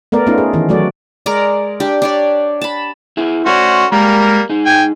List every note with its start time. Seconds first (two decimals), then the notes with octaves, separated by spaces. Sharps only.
0.12 A3 B3 A#4 D5
0.27 A3 B3 C#4 D#4 F4
0.38 G#4
0.53 D#3 E3
0.69 F#3 A3 F#4 D5
1.26 G#3 A#4 D5 A#5
1.80 D4 G4
2.02 D4 C#5 D5
2.61 A5 B5
3.17 E4 G#4
3.46 A3 C#4 F#4 C5 D5
3.92 G3 G#3 A#3 A#4
4.50 D#4 G#4
4.66 G5 G#5